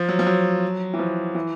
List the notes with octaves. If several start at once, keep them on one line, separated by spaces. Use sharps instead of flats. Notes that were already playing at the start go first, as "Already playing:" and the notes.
Already playing: F3
F#3
F3
F#3
E3
F3
E3